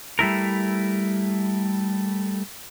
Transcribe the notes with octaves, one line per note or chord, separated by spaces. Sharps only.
G3 A3 E4 A#4